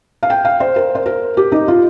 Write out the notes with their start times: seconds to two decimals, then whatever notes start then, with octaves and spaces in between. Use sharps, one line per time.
0.23 F5
0.30 G5
0.45 F5
0.60 C5
0.76 A#4
0.95 C5
1.06 A#4
1.37 G4
1.52 D#4
1.68 F4